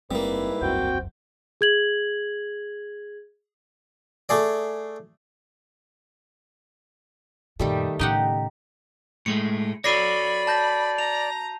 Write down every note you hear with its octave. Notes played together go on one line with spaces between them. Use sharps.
F#1 G#2 G3 A#3 C4 E4 B4
E1 C2 F#2 C4 F#4 G5
G#4 G#6 F#7
A3 G#4 D5
F#2 A#2 D#3 G3 A3
A2 C#3 D#4 G4 F#5
A2 G#3 A3 C#7
F#4 A4 C#5 D5 B5 A#6 C7 D#7
A5 G6 A#6
A#5 F7